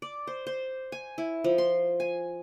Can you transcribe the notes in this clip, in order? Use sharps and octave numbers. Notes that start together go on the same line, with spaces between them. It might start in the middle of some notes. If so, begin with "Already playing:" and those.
D5
C5
C5
G#5
E4
F3
C6
G#5